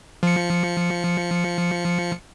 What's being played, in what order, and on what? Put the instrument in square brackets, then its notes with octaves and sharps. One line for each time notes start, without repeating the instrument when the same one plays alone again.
[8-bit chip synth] F3 C#7